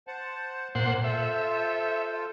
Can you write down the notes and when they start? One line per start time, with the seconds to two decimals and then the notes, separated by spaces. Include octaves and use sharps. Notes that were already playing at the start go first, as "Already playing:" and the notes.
0.07 C5 F#5 A5
0.75 A#2 C5 F#5
1.04 F4 A4 C5 E5